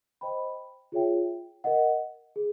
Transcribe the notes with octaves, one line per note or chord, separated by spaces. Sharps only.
C5 D#5 G5 B5
F4 G#4 C#5 E5 G5
A#4 D#5 F#5
G#4